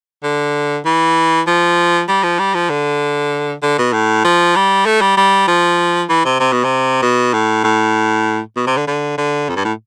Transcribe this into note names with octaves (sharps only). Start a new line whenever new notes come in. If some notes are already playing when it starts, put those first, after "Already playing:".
D3
E3
F3
G3
F3
G3
F3
D3
D3
B2
A2
F3
G3
A3
G3
G3
F3
E3
C3
C3
B2
C3
B2
A2
A2
B2
C3
D3
D3
D3
F2
G2
A2